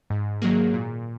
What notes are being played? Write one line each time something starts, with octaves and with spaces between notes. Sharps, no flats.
G#2
D#3 F#3 A#3 G#4
A#2